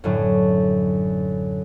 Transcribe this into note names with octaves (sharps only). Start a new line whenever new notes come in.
F#2 A2 D3 F#3